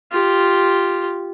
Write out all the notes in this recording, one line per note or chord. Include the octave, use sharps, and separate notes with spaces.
F4 G4